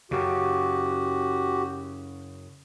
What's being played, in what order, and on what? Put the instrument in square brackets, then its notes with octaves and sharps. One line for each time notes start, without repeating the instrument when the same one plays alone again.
[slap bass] F#2 C#3 [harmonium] F#4 G4